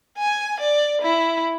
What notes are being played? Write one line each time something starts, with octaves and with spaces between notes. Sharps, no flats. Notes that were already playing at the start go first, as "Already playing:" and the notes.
G#5
D5
E4